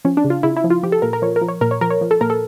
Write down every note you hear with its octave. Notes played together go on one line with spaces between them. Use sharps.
F3 C#4
D4
C#3
F4
C#3 E4
E4
F3
F4
F3 G4
A4
A#2 A#4
A#4
F3 C#5
A#4
F3
C#5
A#2 A#4
C#5
F3 A#4
C#5
F3
A4
A#2 A#4
A4